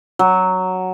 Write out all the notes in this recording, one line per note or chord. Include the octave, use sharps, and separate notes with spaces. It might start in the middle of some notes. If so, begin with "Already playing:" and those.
F#3